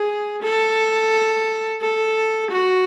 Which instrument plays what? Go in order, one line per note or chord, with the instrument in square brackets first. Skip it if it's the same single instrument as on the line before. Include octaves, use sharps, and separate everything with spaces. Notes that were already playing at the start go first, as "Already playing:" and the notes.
Already playing: [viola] G#4
A4
A4
F#4